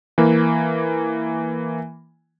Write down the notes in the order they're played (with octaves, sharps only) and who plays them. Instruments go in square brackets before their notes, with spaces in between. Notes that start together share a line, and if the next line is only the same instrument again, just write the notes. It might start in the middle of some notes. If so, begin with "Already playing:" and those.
[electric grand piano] E3 A#3